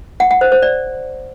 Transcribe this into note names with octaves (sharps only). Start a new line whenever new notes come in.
F#5
F#5
C5
C5
D5